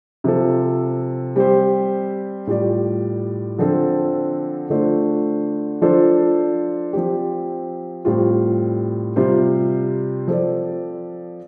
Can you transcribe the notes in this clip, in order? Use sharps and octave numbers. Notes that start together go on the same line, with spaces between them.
C3 F3 C4 F4 A4
G3 C4 G4 C5
A2 G3 F4 D5
D3 F3 C4 A4
D3 A3 D4 F4 C5
F3 D4 F4 A4 C5
F3 C4 G4
A2 G3 C4 F4
C3 G3 F4 C5
F3 C4 A4 D5